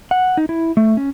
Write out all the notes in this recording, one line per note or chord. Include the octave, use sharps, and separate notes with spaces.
F#5
D#4
E4
A3
C#4